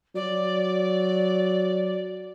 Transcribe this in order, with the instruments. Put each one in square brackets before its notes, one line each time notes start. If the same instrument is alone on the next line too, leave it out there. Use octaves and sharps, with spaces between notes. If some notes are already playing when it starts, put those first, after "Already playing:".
[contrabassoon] F#3 [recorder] D5